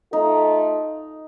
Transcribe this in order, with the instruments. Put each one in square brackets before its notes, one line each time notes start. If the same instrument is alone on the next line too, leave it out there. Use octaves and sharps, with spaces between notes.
[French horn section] A3 F4 A4 [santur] D#4